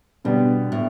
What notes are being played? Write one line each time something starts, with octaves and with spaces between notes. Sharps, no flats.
B2 D3 G3 B3
A2